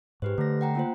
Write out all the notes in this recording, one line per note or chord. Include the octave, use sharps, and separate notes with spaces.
G#2 G4 B4 C5
D3 A3 A#6
F#5 G5 A#5
A#3 F4 C5